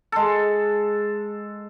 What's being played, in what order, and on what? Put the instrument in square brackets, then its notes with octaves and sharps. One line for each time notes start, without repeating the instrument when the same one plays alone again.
[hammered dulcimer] G#3 A4